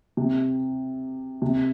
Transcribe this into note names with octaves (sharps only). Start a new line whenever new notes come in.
C3
C3